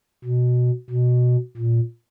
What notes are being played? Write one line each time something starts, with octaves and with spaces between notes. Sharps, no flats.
B2
B2
A#2